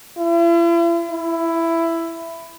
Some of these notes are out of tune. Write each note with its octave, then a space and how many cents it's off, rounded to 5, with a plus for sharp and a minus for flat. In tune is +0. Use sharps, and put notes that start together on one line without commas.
E4 +45
E4 +10